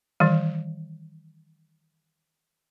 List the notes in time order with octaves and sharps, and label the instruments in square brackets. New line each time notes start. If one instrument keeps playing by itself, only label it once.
[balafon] D#3 E3 G3